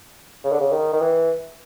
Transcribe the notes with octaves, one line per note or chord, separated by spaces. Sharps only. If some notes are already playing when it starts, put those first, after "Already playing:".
C#3
D3
C#3
D#3
D#3
E3